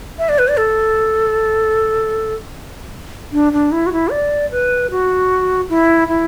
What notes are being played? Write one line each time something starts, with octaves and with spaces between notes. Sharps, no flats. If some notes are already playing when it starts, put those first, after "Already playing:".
E5
D5
B4
D5
A4
D4
D4
E4
F#4
E4
D5
B4
F#4
E4
E4